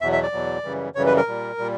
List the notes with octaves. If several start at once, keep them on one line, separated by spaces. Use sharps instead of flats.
E2 B2 F#3 E5
E5
D5
E2 B2 F#3
F#2 C#3 E3 G3
F#2 C#3 E3 G3 C#5
B4
A#4
A#2 G3
A#2 G3